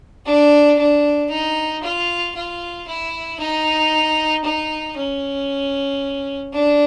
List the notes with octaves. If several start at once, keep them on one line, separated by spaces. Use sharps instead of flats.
D4
D4
D#4
F4
F4
E4
D#4
D#4
C#4
D4